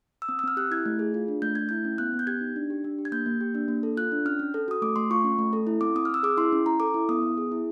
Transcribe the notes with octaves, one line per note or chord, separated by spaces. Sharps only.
E6
C4 D#6
E6
C4 F6
G4 F#6
E4 G#6
A3
G#4
F4
D4
A3 G6
A3 G#6
E4 G6
C#4
B3 F#6
B3
G6
G4 G#6
D#4
D4
G4
D4
G4
G#6
A#3 G6
A#3
G4
D4
A#3
A4
F4 F#6
D4
C#4 F6
C#4
A4
F#4 D#6
A3 D6
A3 C6
F4 C#6
C#4
A3
A4
E4
C4 D6
C4 D#6
F6
C4 E6
G#4 D6
E4 C6
C#4
C#4 A#5
A4 D6
E4
B3 D#6
B3
G#4
E4